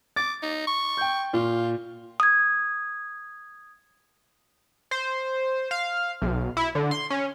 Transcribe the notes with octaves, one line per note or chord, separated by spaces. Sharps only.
D6 A6
D#4
C#6
G5 G6
A#2 F4
D#6 G#6
C5
F5
B1
E4
D3
C6
C#4